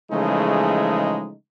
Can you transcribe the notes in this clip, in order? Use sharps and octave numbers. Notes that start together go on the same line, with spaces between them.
C#3 E3 F3 G#3 A3 D#4